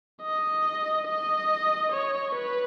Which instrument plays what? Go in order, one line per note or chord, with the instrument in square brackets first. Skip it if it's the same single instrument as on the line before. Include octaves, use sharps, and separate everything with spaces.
[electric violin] D#5
D#5
C#5
B4